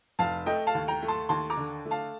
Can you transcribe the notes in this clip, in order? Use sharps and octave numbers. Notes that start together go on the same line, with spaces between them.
F1 F5 A5
A3 D#5 G5
F5 A5
D#2
G5 A#5
A3
A5 C6
D#2 A5 C6
A#5 D6
D3
A3
F5 A5